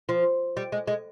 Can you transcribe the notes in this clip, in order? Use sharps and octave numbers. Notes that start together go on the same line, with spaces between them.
F3
G3
G#3
G#3